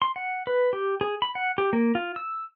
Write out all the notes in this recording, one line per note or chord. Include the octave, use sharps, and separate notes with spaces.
C6
F#5
B4
G4
G#4
B5
F#5
G4
A#3
F4
E6